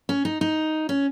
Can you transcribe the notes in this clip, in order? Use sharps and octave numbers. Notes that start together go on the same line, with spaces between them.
C#4
D#4
D#4
C#4